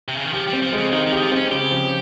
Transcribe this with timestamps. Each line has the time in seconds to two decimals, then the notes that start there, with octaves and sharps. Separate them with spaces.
0.08 C3
0.17 C#3
0.24 D#3
0.33 F3 G4
0.47 G3
0.53 C4
0.63 F3
0.73 G#3
0.78 C#3
0.92 D#3 D#4
1.07 D#3
1.12 G4
1.17 D#3
1.21 F3
1.32 C4 C#4
1.52 C#3 G4
1.71 F3